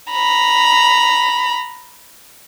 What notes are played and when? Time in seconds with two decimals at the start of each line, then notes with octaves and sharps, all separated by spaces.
0.11 A#5 B5